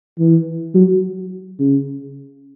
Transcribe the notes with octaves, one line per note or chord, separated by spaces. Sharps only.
E3
F#3
C#3